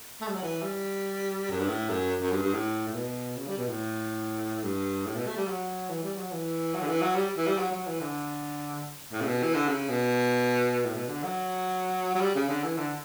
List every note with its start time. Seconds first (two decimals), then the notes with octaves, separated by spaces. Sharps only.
0.21 A3
0.28 G3
0.35 F#3
0.42 E3
0.62 G3
1.51 F#2
1.60 G2
1.68 A2
1.89 F#2
2.21 F#2
2.32 G2
2.42 G2
2.53 A2
2.88 A2
2.94 B2
3.37 C#3
3.47 G3
3.57 B2
3.68 A2
4.63 G2
5.05 A2
5.15 B2
5.27 A3
5.37 G3
5.47 F#3
5.90 E3
6.03 G3
6.18 F#3
6.32 E3
6.74 F#3
6.82 D3
6.87 E3
7.02 F#3
7.16 G3
7.37 E3
7.47 G3
7.58 F#3
7.71 F#3
7.87 E3
8.00 D3
9.12 A2
9.21 C#3
9.26 B2
9.43 E3
9.54 D3
9.69 C#3
9.89 B2
10.85 A2
10.95 B2
11.09 D3
11.23 F#3
12.15 F#3
12.21 G3
12.35 C#3
12.49 D3
12.63 E3
12.77 D3